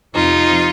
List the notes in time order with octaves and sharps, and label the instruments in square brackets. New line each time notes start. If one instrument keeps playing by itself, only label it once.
[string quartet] F2 C3 F3 D#4 F4